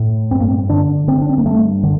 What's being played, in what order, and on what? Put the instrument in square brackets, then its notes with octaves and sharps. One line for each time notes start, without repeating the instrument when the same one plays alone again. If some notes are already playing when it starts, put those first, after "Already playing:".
Already playing: [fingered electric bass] A2
G2 C4
A#3
C4
D3 D4
D3 C4
D4
C4
A#3
G2 A3
D3